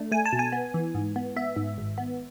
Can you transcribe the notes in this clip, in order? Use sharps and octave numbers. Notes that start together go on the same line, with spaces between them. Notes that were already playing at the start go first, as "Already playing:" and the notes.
Already playing: A3 D4
A3 G#5
A5
B2
G#5
B3
E3
G#2
B3
B3 E5
G#2
G#1
B3